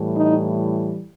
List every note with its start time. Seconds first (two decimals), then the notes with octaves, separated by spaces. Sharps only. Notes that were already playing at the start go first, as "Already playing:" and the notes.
Already playing: A2 E3 G3
0.14 D#4